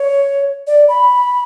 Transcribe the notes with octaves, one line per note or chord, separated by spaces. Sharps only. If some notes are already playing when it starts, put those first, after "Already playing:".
Already playing: C#5
D5
B5